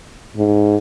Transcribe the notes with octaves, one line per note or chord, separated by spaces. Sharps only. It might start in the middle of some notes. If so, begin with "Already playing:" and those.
G#2